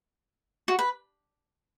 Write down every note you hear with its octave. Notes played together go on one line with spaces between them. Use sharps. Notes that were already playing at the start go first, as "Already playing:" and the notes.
F#4
B4